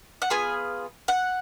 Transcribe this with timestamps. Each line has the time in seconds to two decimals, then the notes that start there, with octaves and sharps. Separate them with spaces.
0.22 F#5
0.30 B3 F4 G#4 G#5
1.08 F#5